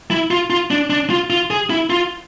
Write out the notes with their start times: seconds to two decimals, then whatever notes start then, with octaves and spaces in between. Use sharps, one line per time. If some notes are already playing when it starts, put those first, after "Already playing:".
0.11 E4
0.31 F4
0.50 F4
0.71 D4
0.90 D4
1.10 F4
1.30 F4
1.50 G#4
1.70 E4
1.90 F4